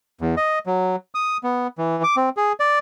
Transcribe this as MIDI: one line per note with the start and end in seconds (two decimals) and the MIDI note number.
0.21 0.35 40
0.37 0.59 75
0.66 0.96 54
1.15 1.37 87
1.43 1.67 59
1.78 2.03 52
2.04 2.16 86
2.17 2.29 60
2.37 2.53 68
2.60 2.79 74